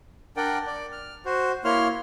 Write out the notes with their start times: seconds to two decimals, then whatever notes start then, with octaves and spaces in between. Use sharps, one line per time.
0.37 D4 A#4 D5 F#5 G5
0.67 D5
0.92 F6
1.25 F#4 C5
1.64 A#3 E4 C#5 C6 F6